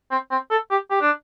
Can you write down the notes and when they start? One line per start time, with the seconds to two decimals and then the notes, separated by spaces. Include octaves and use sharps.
0.11 C4
0.31 C4
0.51 A4
0.71 G4
0.91 G4
1.01 D4